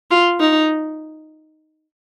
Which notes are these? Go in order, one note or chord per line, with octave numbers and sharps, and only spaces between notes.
F4
D#4